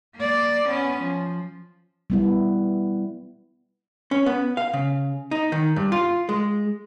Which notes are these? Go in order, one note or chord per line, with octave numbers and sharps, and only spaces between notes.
A#3 D5
B3 C#4
F3
G3 B3 E4
C#4
B3
F5
C#3
D#4
D#3
G2
F4
G#3